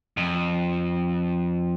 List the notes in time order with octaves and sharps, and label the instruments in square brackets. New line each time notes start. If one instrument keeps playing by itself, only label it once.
[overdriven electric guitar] F2